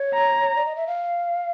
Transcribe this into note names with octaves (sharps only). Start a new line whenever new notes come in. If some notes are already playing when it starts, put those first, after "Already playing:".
Already playing: C#5
A#5
D5
D#5
E5
F5